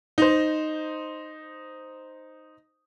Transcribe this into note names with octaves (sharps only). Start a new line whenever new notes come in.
D#4 C5